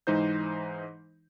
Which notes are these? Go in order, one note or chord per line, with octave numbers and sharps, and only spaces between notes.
G#2 E3 D#4 C5 G6